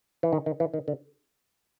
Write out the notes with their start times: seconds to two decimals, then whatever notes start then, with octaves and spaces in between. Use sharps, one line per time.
0.23 E3
0.33 D#3
0.46 D#3
0.60 E3
0.74 D#3
0.88 D3